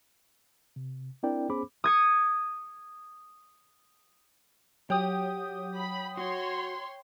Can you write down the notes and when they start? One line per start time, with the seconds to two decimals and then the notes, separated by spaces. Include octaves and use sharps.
0.76 C3
1.23 C4 D4 E4 A#4 D5 G5
1.49 B3 C#4 G#4 C5 B5 D6
1.84 D#6 G#6 C#7
4.90 F#3 G4 G5 D#6
5.75 B5
6.17 F#4 C#5 C6